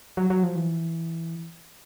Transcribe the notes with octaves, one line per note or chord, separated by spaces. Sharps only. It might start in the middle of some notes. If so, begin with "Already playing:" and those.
F#3
F#3
F3
E3